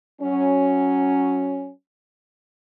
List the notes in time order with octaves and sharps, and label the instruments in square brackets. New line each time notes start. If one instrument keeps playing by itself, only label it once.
[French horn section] F#3 C#4